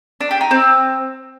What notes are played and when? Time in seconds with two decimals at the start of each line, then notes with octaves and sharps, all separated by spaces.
0.21 D4
0.31 G4
0.41 D#4
0.51 C4